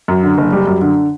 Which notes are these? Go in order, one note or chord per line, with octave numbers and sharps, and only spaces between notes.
F#2
D3
F#1
G3
F#2
D3